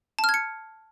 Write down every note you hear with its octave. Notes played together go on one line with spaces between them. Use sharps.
A5
F6
G#6
C#7